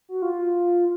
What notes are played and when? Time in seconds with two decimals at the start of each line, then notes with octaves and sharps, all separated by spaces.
0.09 F#4
0.22 F4